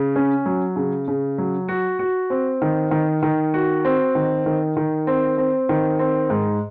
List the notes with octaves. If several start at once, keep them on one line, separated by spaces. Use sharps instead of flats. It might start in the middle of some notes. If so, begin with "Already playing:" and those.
Already playing: C#3
C#4
F#3
C#3
C#3
F#3
F#4
F#4
C4
D#3
D#3
D#3
F#4
C4
D#3
D#3
D#3
C4
C4
D#3
C4
G#2